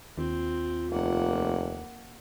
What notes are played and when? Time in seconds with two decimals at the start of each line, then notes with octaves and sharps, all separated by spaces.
0.18 D#2 C4 F4
0.90 F1 A#3 F#5